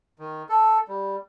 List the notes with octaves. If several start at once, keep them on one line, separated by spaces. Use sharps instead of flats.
D#3
A4
G3